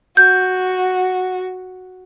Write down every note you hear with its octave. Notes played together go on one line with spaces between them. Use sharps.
F#4 G6